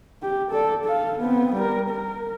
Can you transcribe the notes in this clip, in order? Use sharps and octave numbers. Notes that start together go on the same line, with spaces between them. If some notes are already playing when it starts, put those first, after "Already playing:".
G4
A4 D5
A4 F5
B3 C4
G3 A#4
A#4